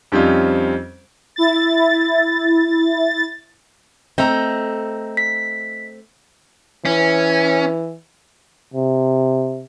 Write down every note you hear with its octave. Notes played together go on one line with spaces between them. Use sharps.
F2 G3 C4 C#4 D#4 F4
E4 A6
A3 C4 D#5 A#5
B6
E3 C#4
C3